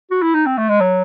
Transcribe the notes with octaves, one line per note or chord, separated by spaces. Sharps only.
F#4
E4
D#4
C4
A3
G#3
F#3